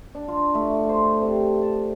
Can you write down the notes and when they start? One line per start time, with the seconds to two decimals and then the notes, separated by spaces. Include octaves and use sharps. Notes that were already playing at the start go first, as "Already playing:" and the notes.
0.15 D4
0.28 F4
0.55 A3
0.89 C5
1.05 A4
1.21 C3
1.61 A5